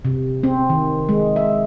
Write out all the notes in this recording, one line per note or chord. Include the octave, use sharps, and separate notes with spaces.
C3
C4
D#3
G#3
E5